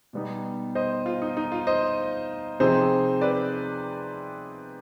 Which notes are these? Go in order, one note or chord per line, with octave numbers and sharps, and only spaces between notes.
B2 G3 B3 D#4
C5 D#5
F4
D#4
D#4
F4
C5 D#5
C3 F3 C4 D#4 G#4 C5
B4 D5